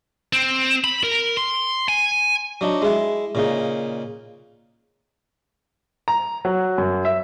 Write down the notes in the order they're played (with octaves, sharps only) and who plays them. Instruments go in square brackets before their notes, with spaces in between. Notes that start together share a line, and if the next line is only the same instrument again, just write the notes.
[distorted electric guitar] C4
B5
A#4
C6
G#5
[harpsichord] F#3 D4 D#4
G#3 E4
A#2 C#3 D#4
[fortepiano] A#5
F#3
F#2
E5